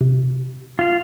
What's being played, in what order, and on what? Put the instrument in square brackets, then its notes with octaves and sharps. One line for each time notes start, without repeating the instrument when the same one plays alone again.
[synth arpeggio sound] C3
[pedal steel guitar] F4 F5